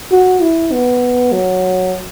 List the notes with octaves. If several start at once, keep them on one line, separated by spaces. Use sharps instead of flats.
F#4
E4
B3
F#3